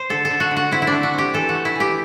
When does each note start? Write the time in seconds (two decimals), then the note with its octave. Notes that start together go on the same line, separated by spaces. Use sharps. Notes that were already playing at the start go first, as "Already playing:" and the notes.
Already playing: C5
0.10 D3 A4
0.25 A4
0.30 D3
0.40 F#4
0.51 D3
0.57 F#4
0.71 C4 E4
0.82 E4
0.87 A3 D4
1.03 F#4
1.14 C4 G4
1.34 E3 A4
1.49 F#4
1.55 A3
1.65 E4
1.75 E3 G4